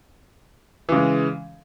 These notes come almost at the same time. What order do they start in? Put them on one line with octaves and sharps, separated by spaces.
E3 C#3 G#3